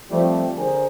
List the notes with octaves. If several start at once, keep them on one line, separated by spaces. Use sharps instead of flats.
F3 G3 A3 C4
D3 G#4 A#4 C5